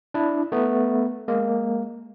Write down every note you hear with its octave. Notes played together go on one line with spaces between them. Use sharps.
D4 E4
A3 B3
G#3 A#3